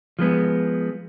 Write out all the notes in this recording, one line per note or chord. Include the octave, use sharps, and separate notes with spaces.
F3 G#3 B3